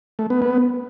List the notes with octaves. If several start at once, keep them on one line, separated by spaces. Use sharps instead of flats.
A3
B3
B3